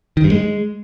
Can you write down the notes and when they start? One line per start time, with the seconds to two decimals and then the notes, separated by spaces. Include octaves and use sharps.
0.17 D#3
0.24 G2
0.32 G#3